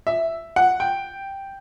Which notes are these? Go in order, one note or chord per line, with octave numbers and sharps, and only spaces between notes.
E5
F#5
G5